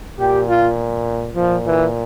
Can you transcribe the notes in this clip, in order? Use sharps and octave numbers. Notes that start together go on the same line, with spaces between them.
A#2 G4
F4
A#2 F3
E3